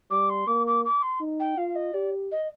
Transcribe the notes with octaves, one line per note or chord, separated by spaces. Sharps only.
G3 D6
C6
A#3 D6
D6
D6
C6
D#4
G5
F4 F5
D#5
G4 D5
D#5